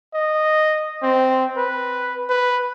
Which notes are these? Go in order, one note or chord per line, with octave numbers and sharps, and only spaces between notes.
D#5
C4
B4
B4